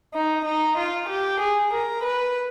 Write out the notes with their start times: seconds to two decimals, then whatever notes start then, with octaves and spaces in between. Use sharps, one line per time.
0.13 D#4
0.45 D#4
0.77 F4
1.08 G4
1.40 G#4
1.72 A#4
2.03 B4